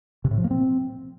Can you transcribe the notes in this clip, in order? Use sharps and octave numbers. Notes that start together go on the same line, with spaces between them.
C3
A2
F3
A#3
C4